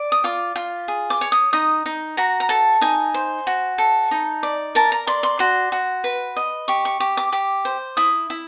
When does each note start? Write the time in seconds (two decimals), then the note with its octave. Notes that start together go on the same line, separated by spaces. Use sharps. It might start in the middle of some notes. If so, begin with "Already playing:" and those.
Already playing: D5
0.12 D#6
0.24 F4 D6
0.56 F4
0.88 G#4
1.10 D6
1.21 C#5
1.32 D#6
1.53 D#4 D#6
1.86 D#4
2.17 F#4 A#5
2.40 A#5
2.49 A4 A5
2.81 D#4 G#5
3.14 C5
3.47 F#4
3.78 A4
4.11 D#4
4.43 D5
4.75 A#4 A5
4.92 A#5
5.07 D5 C6
5.23 C6
5.39 F#4 C6
5.72 F#4
6.04 B4
6.36 D#5
6.68 G4 C#6
6.85 C#6
7.00 G4 D6
7.17 D6
7.32 G4 D6
7.65 C5
7.97 E4 D#6
8.30 E4